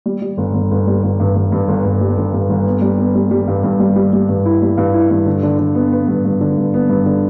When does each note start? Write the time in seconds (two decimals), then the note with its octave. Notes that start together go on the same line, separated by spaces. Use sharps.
0.06 G3
0.22 G3
0.37 G1
0.54 G1
0.71 G1
0.87 G3
1.03 G1
1.20 G2
1.35 G2
1.52 G2
1.68 G1
1.85 G1
2.01 G3
2.17 G1
2.33 G2
2.50 G1
2.67 B3
2.82 G3
2.98 B3
3.15 G3
3.31 G3
3.48 G2
3.63 G2
3.80 G3
3.96 G3
4.13 G3
4.29 G2
4.46 E4
4.62 G3
4.78 G2
4.94 E4
5.10 G2
5.26 D3
5.43 D3
5.59 D3
5.75 B3
5.92 B3
6.08 G2
6.25 G2
6.41 D3
6.57 G2
6.74 B3
6.89 G2
7.06 D3